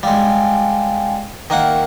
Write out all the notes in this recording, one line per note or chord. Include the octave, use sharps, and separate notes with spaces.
G3 G#3 F5 G5 G#5
D#3 A#3 F#5 G5